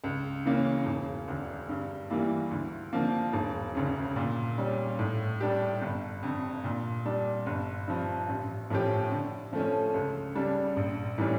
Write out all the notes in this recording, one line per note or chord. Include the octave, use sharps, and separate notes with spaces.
C#2
C#3 E3 A#3 C#4
E1
D2 D3
G2
E3 G3 A#3 E4
D2
D3 F3 A#3
E1
D2 C#3
A#2
G3 C#4
A2
G3 D4 G4
G1
F2 D3
A#2
G3 D4
G1
G2 F3
A1
A2 F3 C#4 G4
D3
F3 A3 C#4
C#2
C#3 G3 D4
A#1
A2 E3 G3 C#4